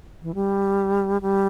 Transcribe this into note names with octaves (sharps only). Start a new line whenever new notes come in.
E3
G3
G3